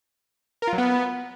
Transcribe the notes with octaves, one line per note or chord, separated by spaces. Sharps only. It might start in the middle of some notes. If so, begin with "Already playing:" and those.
A#4
F4
F#3
B3